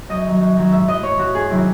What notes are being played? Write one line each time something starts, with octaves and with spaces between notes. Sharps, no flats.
F#2 D#5
D#3 F#3
F#2
D#3 F#3
G#2 E5
E3 D#5
G#2 C#5
E3 F#4
E2 G#4
C3 D#3 F#3 E4